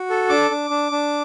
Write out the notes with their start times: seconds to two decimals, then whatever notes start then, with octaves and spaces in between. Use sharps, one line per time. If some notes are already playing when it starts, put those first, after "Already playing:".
Already playing: F#4
0.10 A4
0.29 D4 D6
0.51 D4
0.70 D4
0.92 D4